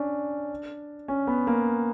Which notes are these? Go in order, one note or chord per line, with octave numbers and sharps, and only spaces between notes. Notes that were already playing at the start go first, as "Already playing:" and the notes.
Already playing: C#4 D4
C#4
B3
A#3